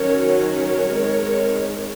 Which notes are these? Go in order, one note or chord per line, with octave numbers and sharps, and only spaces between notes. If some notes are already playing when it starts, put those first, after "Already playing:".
Already playing: D#3 F#3 C#4 A#4 C#5
A#4 C#5
D#3 G#3 C4